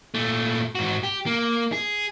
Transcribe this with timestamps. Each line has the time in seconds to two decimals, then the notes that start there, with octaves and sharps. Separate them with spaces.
0.14 A#2 A3
0.75 G#2 F#4
1.03 G4
1.26 A#3
1.72 G#4